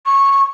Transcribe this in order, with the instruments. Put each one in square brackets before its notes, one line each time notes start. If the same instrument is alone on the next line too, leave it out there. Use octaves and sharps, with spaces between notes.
[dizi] C#6